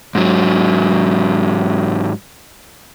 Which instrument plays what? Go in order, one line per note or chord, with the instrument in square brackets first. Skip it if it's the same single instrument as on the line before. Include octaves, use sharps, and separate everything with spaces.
[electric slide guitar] G#2 F#3